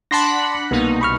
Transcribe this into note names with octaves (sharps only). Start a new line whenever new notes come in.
D4 F#5 A5 B5 C6 A#6
C2 B2 A#3 B3 D#4
B5 C#6 F6